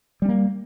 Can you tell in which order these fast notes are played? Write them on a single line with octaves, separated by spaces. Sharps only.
G3 C#4 A#3